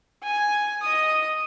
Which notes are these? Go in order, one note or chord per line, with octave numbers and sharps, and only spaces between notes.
G#5
D#5 D#6